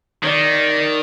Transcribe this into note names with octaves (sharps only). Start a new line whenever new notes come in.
D#3 D5